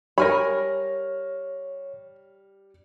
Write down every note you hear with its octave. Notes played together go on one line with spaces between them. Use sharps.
G3 A#4 C#5 G#5 B5 F6 A#6